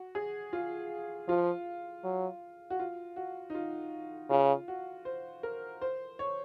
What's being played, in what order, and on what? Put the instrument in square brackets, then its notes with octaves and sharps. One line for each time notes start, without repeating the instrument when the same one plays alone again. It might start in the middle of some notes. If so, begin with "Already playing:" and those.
Already playing: [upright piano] F#4
G#4
F4
[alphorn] F3 [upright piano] F4
[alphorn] F#3
[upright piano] F#4
F4
F#4
D#4
F4
[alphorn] C#3 [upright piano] F4
[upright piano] F#4
C5
A#4
C5
C#5